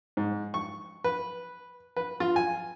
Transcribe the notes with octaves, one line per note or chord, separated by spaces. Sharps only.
G#2
C#6
B4
B4
F4
G#5